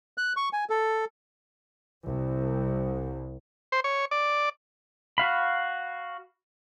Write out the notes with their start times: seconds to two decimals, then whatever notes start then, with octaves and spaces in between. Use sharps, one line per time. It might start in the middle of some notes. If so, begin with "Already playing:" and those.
0.18 F#6
0.37 C#6
0.53 G#5
0.70 A4
2.06 C2
3.72 C5
3.84 C#5
4.11 D5
5.18 F#4 F5 B5